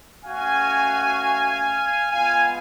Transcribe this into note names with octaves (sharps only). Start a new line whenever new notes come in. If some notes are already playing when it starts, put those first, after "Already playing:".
A3 C#4 F#4 F5 G#5
G#3 B3 F4 F5 G#5